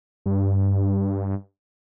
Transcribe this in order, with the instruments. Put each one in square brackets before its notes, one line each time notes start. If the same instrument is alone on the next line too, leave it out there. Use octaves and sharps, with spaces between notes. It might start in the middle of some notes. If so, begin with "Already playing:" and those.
[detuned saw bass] G2